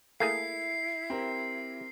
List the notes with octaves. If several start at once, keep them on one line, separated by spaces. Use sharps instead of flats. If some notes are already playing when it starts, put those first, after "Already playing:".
A3 A#3 E4 G#4 C7
C4 G4 A#4